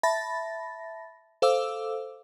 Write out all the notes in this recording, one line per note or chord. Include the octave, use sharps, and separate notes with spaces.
E5 A5 B5 A6 A#6
A4 C5 F5 D6 E6